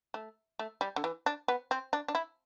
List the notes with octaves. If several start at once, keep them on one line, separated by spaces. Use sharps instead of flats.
A3
A3
G3
D3
E3
D4
B3
C4
D4
D4
E4